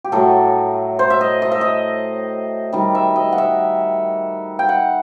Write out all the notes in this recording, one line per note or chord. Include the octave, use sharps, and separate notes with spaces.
G4
A2 F#3 A3 A4
C5
E5
D#5
D#5
E5
D#5
D#3 G3
E5
D#5
F#5
E5
G5
F#5